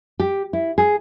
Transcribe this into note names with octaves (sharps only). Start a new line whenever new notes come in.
G4
E4
G#4